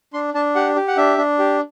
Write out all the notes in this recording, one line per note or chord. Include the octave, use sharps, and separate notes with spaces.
D4 C6
D4 A5
G4 F#5
G4
F#5
D4 E5
D4
G4